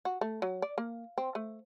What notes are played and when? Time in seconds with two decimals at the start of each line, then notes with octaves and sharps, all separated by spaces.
0.05 F#4
0.21 A3
0.42 F#3
0.62 D5
0.78 A#3
1.18 C4
1.35 A3